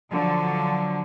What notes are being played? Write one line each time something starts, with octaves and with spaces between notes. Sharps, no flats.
D3 F3 F#3